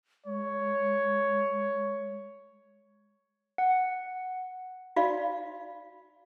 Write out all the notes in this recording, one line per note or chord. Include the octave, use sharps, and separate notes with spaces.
G#3 C#5
F#5
F#4 D5 F5 B5